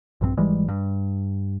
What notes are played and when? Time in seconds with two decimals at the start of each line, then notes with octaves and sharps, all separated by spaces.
0.21 A#1 G2 D3 C4
0.37 G#1 E3 G3 G#3
0.69 G2